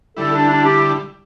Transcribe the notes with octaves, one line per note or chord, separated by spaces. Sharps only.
D3 G3 E4 A4
D4
D4
G4